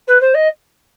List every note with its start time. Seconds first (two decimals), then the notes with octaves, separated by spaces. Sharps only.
0.07 B4
0.20 C5
0.34 D#5